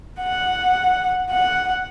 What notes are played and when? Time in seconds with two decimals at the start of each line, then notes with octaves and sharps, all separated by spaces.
0.21 F#5
1.30 F#5